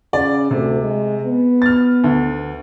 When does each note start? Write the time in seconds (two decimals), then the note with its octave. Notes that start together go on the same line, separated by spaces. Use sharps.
0.13 C#3 D5
0.51 D2 C3
0.81 G#3
1.24 B3
1.62 F6 A6
2.04 D2